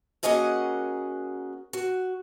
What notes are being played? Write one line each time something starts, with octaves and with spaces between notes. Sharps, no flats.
A#3 C#4 F#4 G#4 D#5 F#5
F#4